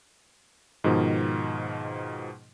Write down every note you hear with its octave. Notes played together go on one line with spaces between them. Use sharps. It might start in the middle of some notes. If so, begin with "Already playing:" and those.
G#2 B2 D#3 F3